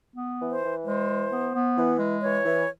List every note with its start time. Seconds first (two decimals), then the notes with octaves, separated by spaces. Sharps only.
0.16 B3
0.40 E3
0.51 C5
0.63 E3
0.85 G#3 C5
1.08 E3
1.31 B3
1.54 B3
1.77 E3
1.99 G#3
2.22 E3 C#5
2.45 E3